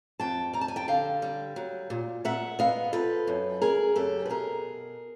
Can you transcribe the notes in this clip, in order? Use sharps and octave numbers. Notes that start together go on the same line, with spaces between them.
F2 G5 A5
G3 A#5
A5
G#5
G5 A5
D3 F5 G5
G3
F#3
A#2
A#2 E5 F#5
B3 D#5 F5
F3 A4 B4
F#2
C#3 G#4 A#4
F#2 G4 A4
B4
B2 G#4 A#4